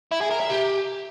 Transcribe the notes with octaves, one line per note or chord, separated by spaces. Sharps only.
E4
G#4
A#4
E5
G4